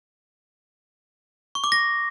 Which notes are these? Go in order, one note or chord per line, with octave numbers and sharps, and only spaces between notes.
C#6
D6
A#6